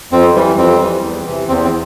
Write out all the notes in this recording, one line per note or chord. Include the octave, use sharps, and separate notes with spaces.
F2 C4
E3 G3
F2 C4
E3 G3
E2
C3 E3
E2 C4
C4